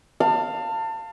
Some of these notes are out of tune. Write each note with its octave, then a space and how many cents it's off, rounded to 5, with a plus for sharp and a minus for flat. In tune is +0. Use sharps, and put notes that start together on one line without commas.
F5 +0 A5 +30